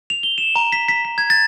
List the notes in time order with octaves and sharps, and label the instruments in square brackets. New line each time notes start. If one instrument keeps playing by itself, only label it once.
[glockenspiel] F7
G7
E7
A#5
B6
B6
B6
G#6
A6